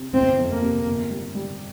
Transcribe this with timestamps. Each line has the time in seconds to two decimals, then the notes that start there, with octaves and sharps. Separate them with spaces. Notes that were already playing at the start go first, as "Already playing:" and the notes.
Already playing: C3
0.13 G1 C4
0.39 F2
0.50 A#3
0.62 C3
0.87 G1
1.10 G3
1.35 G3